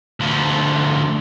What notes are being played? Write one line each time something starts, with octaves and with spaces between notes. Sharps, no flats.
D2 F3